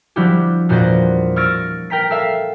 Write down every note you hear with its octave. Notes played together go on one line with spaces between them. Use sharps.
F3 G3 D4 E4 F#4 G4
E2 A#2 F#4 C5 D5 A#6
C#6 E6 F6 A6 A#6 D7
A#4 G5 A#5 B6
A4 E5 F5